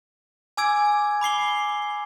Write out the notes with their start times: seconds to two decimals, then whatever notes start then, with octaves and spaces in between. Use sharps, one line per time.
0.57 G#5 D6 E6 G#6 D7
1.21 B5 D6 C7 G7